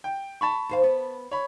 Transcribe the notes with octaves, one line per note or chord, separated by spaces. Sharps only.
G5
A5 B5 C#6
D#2 C5 F5
B3
C#5 B5